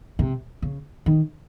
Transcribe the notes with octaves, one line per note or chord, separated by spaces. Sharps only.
C3
C#3
D#3